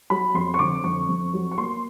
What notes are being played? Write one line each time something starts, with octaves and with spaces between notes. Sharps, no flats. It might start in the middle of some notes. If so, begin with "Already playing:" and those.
F#3 B5
F2 C6
C#6
D3 D6
F2 C#6
F2
F#3
C#6
A#3 C6